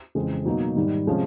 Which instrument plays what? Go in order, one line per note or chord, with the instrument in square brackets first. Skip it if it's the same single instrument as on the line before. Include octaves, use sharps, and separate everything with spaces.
[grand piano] F2 C#3 E3 G#3 C4
B2 F#3 A#3 D#4
G#2 D#3 G3
C3 F3 G#3 C#4